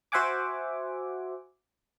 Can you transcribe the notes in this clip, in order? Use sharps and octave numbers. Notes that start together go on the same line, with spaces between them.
F#4 C5 E5 F#5 G#5 D6